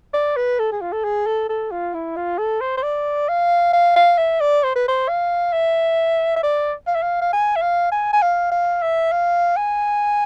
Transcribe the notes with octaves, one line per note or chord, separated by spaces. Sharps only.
D5
B4
A4
G#4
F4
A4
G#4
A4
A4
F4
E4
F4
A4
C5
C5
D5
F5
F5
F5
E5
D5
C5
B4
C5
F5
E5
E5
D5
F5
E5
F5
F5
G#5
E5
F5
G#5
G#5
F5
F5
E5
F5
G#5